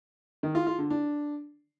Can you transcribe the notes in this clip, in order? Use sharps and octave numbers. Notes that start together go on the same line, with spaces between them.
D#3
F4
F4
D3
D4